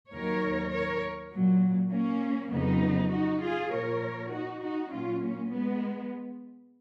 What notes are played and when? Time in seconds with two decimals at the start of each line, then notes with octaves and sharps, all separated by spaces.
0.13 D#2 D#3 F#3 A#4 C#5
0.73 A#4 C#5
1.33 A#2 F#3
1.92 A#3 C#4
2.52 F2 C#3 F#3 B3 D#4
3.12 D#4 F#4
3.42 F4 G#4
3.72 A#2 F3 A#4 C#5
4.32 D#4 F#4
4.62 D#4 F#4
4.91 A#2 F#3 C#4 F4
5.22 A#3 C#4
5.52 G#3 B3